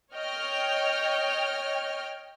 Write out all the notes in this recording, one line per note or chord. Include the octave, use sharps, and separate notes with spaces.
C#5 D#5 G5 F6